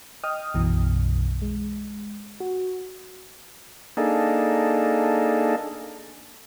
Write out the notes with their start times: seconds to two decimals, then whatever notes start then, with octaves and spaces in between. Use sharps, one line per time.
0.24 D#5 G5 D#6 F6
0.54 B1 F#2 B2 E3
1.42 G#3
2.40 F#4
3.97 A#3 D4 D#4 G#4 A4